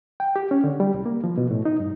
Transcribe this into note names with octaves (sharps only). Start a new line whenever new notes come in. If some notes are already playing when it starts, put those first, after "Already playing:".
G5
G4
C#4
D3
G3
C2
A#3
F3
B2
A2
D#4
G2